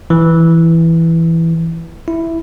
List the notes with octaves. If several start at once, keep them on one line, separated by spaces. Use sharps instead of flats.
E3
E4